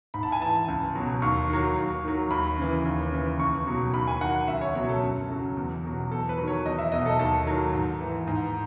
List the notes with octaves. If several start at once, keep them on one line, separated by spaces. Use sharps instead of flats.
G#2 B5
A5
G#5
E3 A5
C#2
B2 F#3
D#2 C#6
D#3 F#3
D#2
D#3 F#3
D#2 B5
C#3 E3
D#2
C#3 E3
C#2 C#6
B2 F#3
D#2 B5
G#5
D#3 F#3 F#5
F#5
C#2 E5
C#5
B2 F#3 C#5
A4
F#2
C#3 F#3
E2
B2 F#3
E2 A4
B4
D#3 F#3
C#5
E2 D#5
E5
B2 F#3 D#5
A4
D#2 A4
D#3 F#3
G#2
E3
G#2